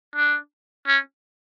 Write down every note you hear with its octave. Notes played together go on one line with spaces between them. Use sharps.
D4
C#4